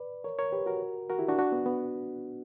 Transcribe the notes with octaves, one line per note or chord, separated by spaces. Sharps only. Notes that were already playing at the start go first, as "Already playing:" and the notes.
Already playing: B4 D5
A#4 C#5
A#4 C#5
G4 B4
F#4 A#4
F#4 A#4
E4 G4
D4 F#4
D4 F#4
B3
B3